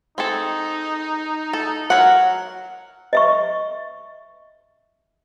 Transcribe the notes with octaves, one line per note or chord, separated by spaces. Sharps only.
C4 D#4 G#4 A4
A4
F#3 A#4 F#5
D#5 E5 C#6